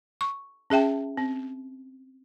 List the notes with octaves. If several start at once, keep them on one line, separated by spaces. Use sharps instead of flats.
C#6
C#4 G#4 E5 G5 A5
C4